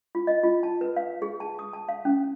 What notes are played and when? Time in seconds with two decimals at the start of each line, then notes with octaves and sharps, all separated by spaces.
0.15 F4
0.27 D#5
0.43 F4
0.63 A5
0.81 B4
0.97 F5
1.22 G#4
1.40 A5
1.59 D#6
1.73 A5
1.89 F5
2.05 C#4